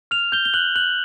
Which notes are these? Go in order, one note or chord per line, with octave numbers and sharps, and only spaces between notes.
F6 F7
G6 G7
G7
F#6 F#7
F#6 F#7